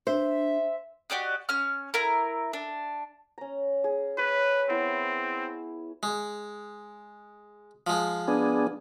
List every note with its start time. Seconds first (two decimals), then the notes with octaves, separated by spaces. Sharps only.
0.07 D4 C5 E5
1.10 F#4 G4 D5 D#5
1.49 C#4 F6
1.94 E4 A#4
2.53 D4
3.38 C#4 A#5
3.84 G#4
4.18 B4 C#5 C#6
4.69 B3 C4 E4
6.03 G#3
7.87 F3 G#3
8.28 B3 D4 G#4